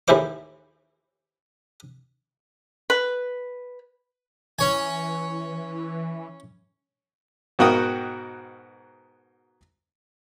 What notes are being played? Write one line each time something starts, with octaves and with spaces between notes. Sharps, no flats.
D#2 A2 E3 E4 C5 D6
B4
E3 C#4 C#5 G#5
G#2 B2 F#4 A#4 G5 D#6